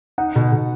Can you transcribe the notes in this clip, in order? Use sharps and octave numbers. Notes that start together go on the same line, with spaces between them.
D#4 F#5
B2
B2